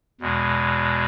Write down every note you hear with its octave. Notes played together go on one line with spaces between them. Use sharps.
E2 B2 G#3